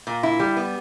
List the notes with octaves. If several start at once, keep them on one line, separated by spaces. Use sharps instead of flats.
A#2
E4
G3
B3